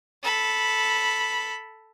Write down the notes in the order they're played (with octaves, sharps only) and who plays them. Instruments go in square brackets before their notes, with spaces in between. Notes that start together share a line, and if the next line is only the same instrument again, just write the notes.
[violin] A4 B5